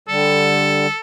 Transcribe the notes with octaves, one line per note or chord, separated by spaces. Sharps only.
D3 G3 A4